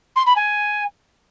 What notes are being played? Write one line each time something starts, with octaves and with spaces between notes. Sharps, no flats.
C6
B5
G#5